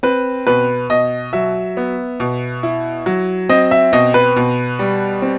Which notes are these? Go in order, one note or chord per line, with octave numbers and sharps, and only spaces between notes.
C4 B4
B2 B4
B2 D#5
F#3 E5
B3
B2
E4
F#3
C4 D#5
E5
B2 D#5
B4
B2
G3
C4